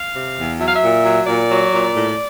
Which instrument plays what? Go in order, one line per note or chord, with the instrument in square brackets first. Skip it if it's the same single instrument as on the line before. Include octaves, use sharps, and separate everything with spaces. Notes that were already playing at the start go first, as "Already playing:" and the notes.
Already playing: [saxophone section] F5
C3
E2
F#3 E5
F5
E5
A#2
F#3
A#2 D5
F#3
A#2
A2